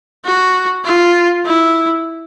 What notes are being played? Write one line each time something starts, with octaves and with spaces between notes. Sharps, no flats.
F#4
F4
E4